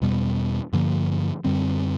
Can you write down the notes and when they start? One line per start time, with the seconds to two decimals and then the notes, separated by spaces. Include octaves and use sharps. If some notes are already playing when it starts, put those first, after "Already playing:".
0.01 E2 B2 G3 B3
0.73 G2 D3 F3 A#3
1.44 F#2 D3 G3 C4